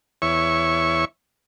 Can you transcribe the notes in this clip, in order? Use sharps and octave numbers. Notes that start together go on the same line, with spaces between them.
E2 C#5 E5 C#6